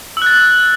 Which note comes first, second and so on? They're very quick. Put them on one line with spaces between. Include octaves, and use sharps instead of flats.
E6 F#6 A6